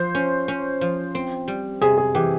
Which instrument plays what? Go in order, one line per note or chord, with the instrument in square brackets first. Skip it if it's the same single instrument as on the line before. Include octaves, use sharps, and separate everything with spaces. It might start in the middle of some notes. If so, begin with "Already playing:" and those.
Already playing: [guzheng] F3 [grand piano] C5
[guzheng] C#4
C#4
F3
C4
G3
[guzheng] C3 [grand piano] G#4
[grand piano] G#4
[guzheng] E3 [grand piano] G4